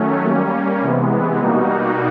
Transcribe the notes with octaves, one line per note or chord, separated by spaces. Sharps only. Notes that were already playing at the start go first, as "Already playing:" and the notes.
Already playing: D#3 F#3 A3 C#4
G3 A#3 C#4
C3 E3 G#3 B3
B2 G3 A#3 D#4 F#4